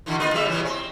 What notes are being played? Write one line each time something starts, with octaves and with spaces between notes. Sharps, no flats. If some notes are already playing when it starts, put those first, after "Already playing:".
B2 D3 E3
A#3 F4 D#5
C#3 G3 E5
A#2 E3
C4